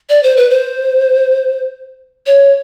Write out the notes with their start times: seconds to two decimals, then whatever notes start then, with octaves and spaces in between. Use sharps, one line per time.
0.09 D5
0.23 C5
0.37 B4
0.50 C5
2.27 C#5